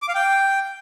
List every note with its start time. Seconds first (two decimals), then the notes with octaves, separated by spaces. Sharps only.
0.02 D6
0.08 F5
0.15 G5